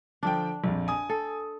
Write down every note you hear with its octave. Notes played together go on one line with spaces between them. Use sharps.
D3 F3 D4 G5
A#1 F2
G#5 D#6
A4